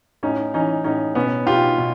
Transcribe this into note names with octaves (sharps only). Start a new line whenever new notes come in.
A2 C#4 D#4
E3 C#4 D#4
A2 C#4 D#4
B2 B3 C#4
B2 F4 G4
B2